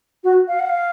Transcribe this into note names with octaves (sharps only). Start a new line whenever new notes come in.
F#4
F5
F#5
F5